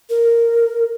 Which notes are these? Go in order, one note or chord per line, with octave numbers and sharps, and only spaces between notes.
A#4